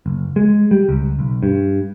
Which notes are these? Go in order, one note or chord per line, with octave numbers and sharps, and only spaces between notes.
F#1
G#3
G3
C#2
B1
G2